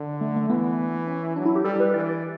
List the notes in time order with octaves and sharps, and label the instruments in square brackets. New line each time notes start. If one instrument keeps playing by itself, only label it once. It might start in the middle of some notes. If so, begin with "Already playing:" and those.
Already playing: [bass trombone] D3
[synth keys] A3
A3
[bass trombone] E3 [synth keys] B3
[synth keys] C#4
[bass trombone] F#3 [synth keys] D4
[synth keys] E4
G4
[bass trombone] G3 [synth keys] A4
[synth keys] B4
[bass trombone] E3 [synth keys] D5
[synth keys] D5